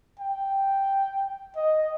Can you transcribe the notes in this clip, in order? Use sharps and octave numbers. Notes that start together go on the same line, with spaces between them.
G5
D#5